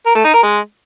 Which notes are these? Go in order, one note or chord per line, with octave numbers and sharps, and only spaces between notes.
A#4
A3
D#4
A#4
G#3